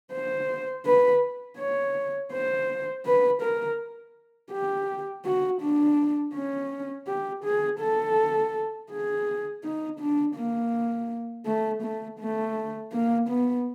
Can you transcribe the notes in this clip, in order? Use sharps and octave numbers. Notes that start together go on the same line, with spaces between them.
C5
B4
C#5
C5
B4
A#4
G4
F#4
D4
C#4
G4
G#4
A4
G#4
D#4
D4
A#3
A3
A3
A3
A#3
B3